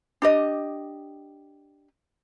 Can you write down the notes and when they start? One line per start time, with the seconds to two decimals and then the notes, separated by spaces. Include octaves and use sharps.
0.22 D4 G4 D#5